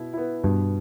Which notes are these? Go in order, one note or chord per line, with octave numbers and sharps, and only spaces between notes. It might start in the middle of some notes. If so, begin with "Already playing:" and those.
Already playing: B2 E4
B3 E4
G2 B2